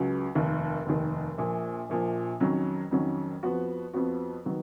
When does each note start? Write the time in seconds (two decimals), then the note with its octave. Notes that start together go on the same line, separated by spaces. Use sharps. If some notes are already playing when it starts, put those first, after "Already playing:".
Already playing: C#2 C#3 F#3 F#4
0.35 F1 D#2 D#3
0.86 F1 D#2 D#3
1.38 A#1 A#2 F3
1.89 A#1 A#2 F3
2.40 F2 D#3 F#3 C#4
2.91 F2 D#3 F#3 C#4
3.43 F2 F3 B3 F#4
3.93 F2 F3 B3 F#4
4.45 D#3 F#3 B3